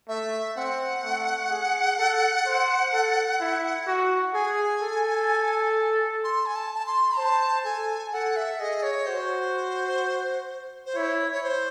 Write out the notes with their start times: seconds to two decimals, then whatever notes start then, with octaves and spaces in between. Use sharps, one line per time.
0.08 A3 E5
0.56 C4 F#5
1.03 A3
1.50 G#4
1.98 A4
2.46 C5
2.93 A4
3.40 E4
3.87 F#4
4.34 G#4 G#5
4.82 A4
6.24 C6
6.46 G#5
6.55 A5
6.75 A5
6.86 C6
7.17 C5 A5
7.65 A4 G#5
8.13 A4 F#5
8.36 E5
8.60 G#4 D#5
8.83 C#5
9.06 F#4 C5
10.86 C5
10.96 E4 C#5
11.32 C#5
11.43 C5